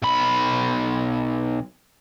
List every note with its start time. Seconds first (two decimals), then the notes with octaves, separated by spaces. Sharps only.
0.02 B1 B5